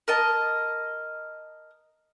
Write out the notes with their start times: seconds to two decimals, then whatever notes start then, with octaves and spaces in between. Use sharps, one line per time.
0.08 A#4 D#5 A5